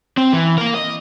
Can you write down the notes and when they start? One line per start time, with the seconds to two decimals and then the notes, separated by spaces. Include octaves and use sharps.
0.17 C4
0.33 E3
0.58 A#3 A#4
0.74 D#5